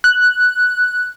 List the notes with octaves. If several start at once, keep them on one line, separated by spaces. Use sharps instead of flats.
F#6